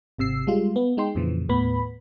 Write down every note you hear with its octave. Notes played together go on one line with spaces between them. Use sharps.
G#1 C3 E6 C7
G3 G#3 F4
B3
G#3 D#4 G5 C6
F2 A#2 C#3 E3 F3
D#2 A2 B3 B5